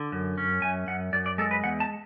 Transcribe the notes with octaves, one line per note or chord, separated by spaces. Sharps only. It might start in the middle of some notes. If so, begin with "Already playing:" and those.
Already playing: D3
F#2
C#4
F#2 G#5
F#2 F#5
F#2 D5
D5
G#3 A4
B4
E2 F#5
A5